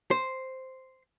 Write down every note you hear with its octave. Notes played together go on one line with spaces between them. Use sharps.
C5